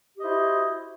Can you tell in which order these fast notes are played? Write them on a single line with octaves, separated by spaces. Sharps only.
G4 D#5 C5 E4 F#4